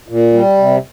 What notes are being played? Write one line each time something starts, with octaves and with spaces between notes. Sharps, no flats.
A#2
G3
C3